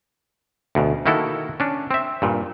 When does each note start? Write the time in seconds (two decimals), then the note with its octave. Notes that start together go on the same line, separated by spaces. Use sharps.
0.75 D2 B2
1.06 D#3 A#3 E4 F#4 A4
1.60 C#4 D4
1.91 C4 E5
2.22 G2 A#2